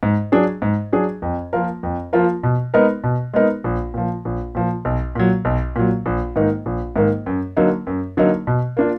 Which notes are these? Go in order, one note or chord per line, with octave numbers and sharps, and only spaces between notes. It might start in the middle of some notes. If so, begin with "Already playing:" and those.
G#2
F#3 D4 G#4
G#2
F#3 D4 G#4
F2
F3 A#3 F4 A#4
F2
F3 A#3 F4 A#4
B2
G#3 B3 D#4 A#4
B2
G#3 B3 D#4 A#4
A#1
A#2 F3
A#1
A#2 F3
B1
A#2 F#3
B1
A#2 F#3
A#1
G#2 D#3 A#3 D#4
A#1
G#2 D#3 A#3 D#4
F#2
D3 F#3 A#3 D#4
F#2
D3 F#3 A#3 D#4
B2
A#3 D4 F4